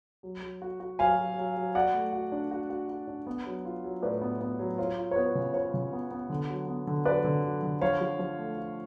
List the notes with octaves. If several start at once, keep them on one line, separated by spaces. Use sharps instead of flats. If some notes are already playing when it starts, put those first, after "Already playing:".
F#3
F#3
F#4
F#4
F#3 F5 G#5
F#3
F#3
F#3
F#4 D5 F#5
A3
F#4
D4
F#4
F#4
F#4
D4
B3
F#3
F4
F#3
A2 B4 D5
B3
B3
F#3
F4 C#5
F4
C#5
B3 B4
C#3
F4 C#5
C#3
B3
B3
D3
F#3
B3
D3
F#3 B4 D5
D3
F#3
D3
F3 C#5 F5
F3
F3
A3
F4